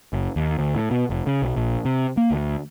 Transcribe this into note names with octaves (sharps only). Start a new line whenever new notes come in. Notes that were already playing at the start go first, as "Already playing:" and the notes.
F#1
D#2
D2
A2
B2
F1
C#3
B1
A#1
C3
A#3
D2